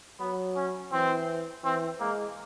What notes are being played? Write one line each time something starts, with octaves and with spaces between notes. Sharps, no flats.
F#3 B3
C#4
E3 C4
E3 C4
G#3 A#3